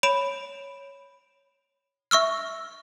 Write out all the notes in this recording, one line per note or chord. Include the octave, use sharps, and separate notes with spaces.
C#5 B5 D7 E7
E5 C#6 E6 F6